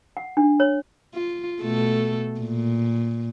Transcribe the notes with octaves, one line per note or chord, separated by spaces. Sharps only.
F#5
D4
C#5
F4
B2 A3 A4
A#2